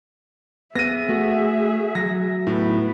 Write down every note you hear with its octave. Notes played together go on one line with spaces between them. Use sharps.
B3 G#4 E5 A#6 D#7
A3 F#4
F#3 A#6
A2 B3 B4